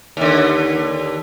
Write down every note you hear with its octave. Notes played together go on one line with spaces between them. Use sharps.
D#2 D3